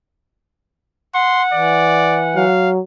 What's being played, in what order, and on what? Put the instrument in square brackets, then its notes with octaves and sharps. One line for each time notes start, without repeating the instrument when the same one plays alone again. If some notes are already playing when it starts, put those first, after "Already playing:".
[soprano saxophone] F#5 [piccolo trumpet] C6
[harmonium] E3 [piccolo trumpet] D5
[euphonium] F#3 [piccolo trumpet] F5